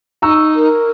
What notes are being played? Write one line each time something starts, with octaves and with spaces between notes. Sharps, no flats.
D#4 A#5 C#6 E6
A#4